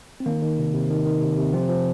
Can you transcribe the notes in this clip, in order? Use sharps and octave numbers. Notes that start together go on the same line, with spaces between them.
C4
D#3 A#3
D#3
C3
C3
D#3
D#3
C3
C3
F3 C4
F3